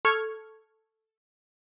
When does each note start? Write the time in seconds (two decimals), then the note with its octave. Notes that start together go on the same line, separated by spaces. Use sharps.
0.05 A4 C#6 F6 G#6